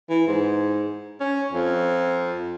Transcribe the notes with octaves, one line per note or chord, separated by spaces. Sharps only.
E3
G#2
C#4
F2